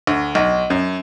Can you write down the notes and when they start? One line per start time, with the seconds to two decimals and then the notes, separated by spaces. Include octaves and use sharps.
0.07 D2
0.35 B1
0.70 F#2